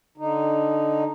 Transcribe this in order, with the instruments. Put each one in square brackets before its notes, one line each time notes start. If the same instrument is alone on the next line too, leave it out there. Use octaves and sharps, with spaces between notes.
[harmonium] D3 D#4